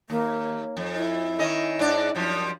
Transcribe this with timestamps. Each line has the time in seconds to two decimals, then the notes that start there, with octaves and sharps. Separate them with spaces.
0.10 D#2 A#3
0.77 F2
0.95 E4
1.38 D#3 C#4 D#5
1.79 G#2 D4 D5
2.15 F#2 F3 G3